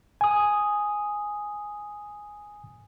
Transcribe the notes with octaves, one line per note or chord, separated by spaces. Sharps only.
G#5 D#6